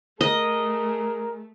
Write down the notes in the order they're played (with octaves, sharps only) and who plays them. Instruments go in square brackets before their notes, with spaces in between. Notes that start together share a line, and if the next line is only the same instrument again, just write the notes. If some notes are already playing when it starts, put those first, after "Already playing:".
[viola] A3 [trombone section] G#4 A#4 [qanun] D#5